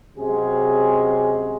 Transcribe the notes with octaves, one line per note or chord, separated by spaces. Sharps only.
C3 F#3 G#3 C#4 G#4